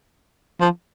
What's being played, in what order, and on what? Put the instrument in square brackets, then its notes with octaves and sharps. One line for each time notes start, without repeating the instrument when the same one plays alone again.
[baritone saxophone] F3